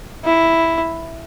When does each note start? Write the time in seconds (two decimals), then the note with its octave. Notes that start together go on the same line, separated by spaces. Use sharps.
0.24 E4